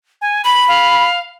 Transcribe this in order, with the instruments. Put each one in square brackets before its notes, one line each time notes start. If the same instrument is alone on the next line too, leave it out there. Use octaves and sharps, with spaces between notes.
[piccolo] G#5
[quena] B5 [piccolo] F#7
[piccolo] F5